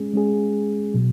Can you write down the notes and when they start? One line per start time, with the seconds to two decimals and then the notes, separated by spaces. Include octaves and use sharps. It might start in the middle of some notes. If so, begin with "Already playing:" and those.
Already playing: G#3 C#4 G#4
0.14 G#3 C#4 G#4
0.94 B2 F#3